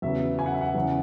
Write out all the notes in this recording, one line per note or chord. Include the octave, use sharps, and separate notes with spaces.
E2 C#3 F#3 B3 E5
G#5
F#5
E5
F#5
E2 C#3 E3